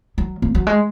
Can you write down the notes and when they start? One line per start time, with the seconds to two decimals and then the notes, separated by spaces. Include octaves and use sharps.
0.18 F#3
0.42 A#3
0.55 F#3
0.67 G#3